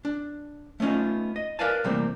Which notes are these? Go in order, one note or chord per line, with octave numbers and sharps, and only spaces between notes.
D4
A3 B3 C#4 D#4 F4
D#5
A#4 B4 D5 F5 G#5 A5
C3 E3 G3 A3 A#3 C4